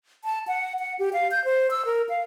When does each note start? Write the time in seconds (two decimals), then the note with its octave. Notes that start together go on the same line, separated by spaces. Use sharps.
0.24 A5
0.47 F#5
0.79 F#5
0.99 G4
1.13 F5
1.31 G6
1.45 C5
1.71 E6
1.85 A#4
2.09 F5